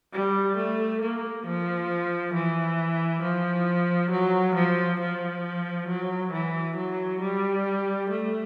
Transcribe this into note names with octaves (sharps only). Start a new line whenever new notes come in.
G3
A3
A#3
F3
E3
F3
F#3
F3
F3
F#3
E3
F#3
G3
A3